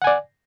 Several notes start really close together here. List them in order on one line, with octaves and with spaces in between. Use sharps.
F#5 G#5 D5